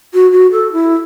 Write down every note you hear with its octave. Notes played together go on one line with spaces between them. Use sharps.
F#4
F#4
A4
E4